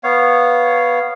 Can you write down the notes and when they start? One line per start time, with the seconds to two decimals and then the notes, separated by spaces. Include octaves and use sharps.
0.04 B3 C#5 F5